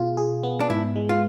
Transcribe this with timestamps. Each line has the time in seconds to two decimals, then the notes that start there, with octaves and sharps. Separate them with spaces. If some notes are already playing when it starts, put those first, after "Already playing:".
Already playing: B2 F4 G#4
0.17 G#4
0.43 B3
0.60 D4
0.70 G#2 E4
0.96 G#3
1.09 F4